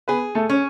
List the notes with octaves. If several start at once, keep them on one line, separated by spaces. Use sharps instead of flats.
B3 G#4 B4
A3 A4
C#4 C#5